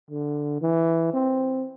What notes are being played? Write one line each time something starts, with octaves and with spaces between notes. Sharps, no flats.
D3
E3
C4